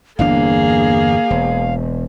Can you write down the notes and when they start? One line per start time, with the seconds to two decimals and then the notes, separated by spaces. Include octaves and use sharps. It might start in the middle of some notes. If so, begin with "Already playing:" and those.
0.19 G1 E2 A#3 D4 G#4 F5
1.30 E1